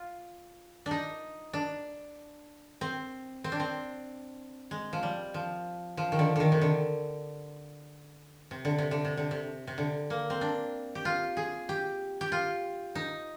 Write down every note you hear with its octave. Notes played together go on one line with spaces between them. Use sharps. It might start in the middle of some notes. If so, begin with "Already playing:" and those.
Already playing: F4
D4
D#4
D4
C4
C4
D4
C4
G#3
F3
G3
F3
F3
D#3
D3
D3 D#3
C3
D3
C3
D3
C3
D3
C3
D3
C3
C3
D3
A#3
C4
D4
G4
F4
G#4
G4
G4
F4
D#4